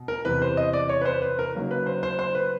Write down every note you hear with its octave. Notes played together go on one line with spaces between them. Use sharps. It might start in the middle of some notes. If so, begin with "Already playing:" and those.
Already playing: B2
A#4
E2 C3 E3 B4
C5
D#5
D5
C#5
B4
C5
B4
A#4
C#3 F#3 A#3 D#4
B4
C5
C5
C5
B4